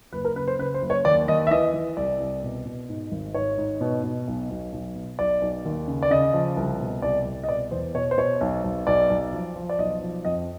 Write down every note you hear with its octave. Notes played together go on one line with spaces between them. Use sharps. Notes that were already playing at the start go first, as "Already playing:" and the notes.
F#1 B4
A#4
C#3 B4
C5
C#3 B4
C5
F#1
C#5
D#2 D5
D#2 D#5
E5
E3 D#5
E3
C2 D5
C2
B2
B2
G#2
G#1
G#2 C#5
G#2
B2
B2
B1
B1
B1
B2
B1 D5
B1
D#2
C#3
D5
C#3 D#5
F3
C2
B2
C2 D5
C2
D#5
B2 D5
E2 C5
B2 C#5
C5
B2 C#5
B1
B1
B1 D5
B1
F3
F3
D5
B1 D#5
F3
F2 D#5